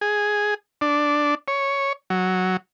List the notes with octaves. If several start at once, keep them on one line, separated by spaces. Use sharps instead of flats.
G#4
D4
C#5
F#3